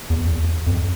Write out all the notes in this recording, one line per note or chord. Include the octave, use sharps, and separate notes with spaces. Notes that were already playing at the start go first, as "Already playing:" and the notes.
E2
F2